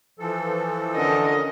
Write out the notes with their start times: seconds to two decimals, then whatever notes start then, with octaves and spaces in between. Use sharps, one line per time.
0.19 E3 F3 A4
0.96 D3 C#4 A#4 D#5